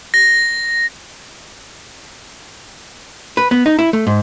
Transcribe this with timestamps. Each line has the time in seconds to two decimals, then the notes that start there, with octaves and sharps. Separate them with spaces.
0.14 A#6
3.37 B4
3.51 B3
3.66 D#4
3.79 E4
3.93 A3
4.07 G#2